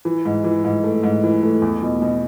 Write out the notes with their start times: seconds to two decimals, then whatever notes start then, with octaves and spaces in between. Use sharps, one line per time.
0.05 E3
0.25 G#2
0.44 E3
0.64 G#2
0.84 A3
1.03 G#2
1.24 E3
1.43 A3
1.62 E2
1.82 B2
2.02 B2